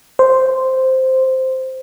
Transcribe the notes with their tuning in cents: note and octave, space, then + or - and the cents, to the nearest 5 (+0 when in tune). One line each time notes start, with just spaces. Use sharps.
C5 -5